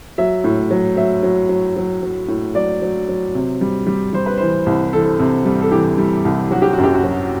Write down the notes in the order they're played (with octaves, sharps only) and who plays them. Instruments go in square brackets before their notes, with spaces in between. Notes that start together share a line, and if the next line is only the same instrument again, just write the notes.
[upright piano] F#3 E5
A2
F#3
F#3 E5
F#3
F#3
F#3
F#3
A2
F#3 D5
F#3
F#3
C3
G3
G3
G3 C5
B4
E3 C5
C2
E3 A4
C3
G3
A4
E3 G4
G3
C2
F#3 F#4
G4
F#4
F#2
G4
F#4
F#3